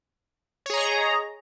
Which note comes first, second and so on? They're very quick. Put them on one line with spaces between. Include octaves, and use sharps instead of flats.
C#5 G#4 A#5 D#5